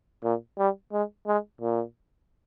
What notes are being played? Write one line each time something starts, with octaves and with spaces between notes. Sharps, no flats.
A#2
G3
G#3
G#3
A#2